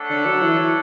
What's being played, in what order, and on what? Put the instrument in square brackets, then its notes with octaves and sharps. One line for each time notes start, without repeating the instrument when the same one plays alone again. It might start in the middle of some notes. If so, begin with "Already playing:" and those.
Already playing: [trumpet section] A3 D4 A4 C#5 F#5
[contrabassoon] D3
F#3
E3
E3